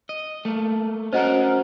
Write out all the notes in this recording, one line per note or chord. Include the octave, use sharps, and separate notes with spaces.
D#5
A3 A#3
C#4 F#4 A#4 C5 D#5 F#5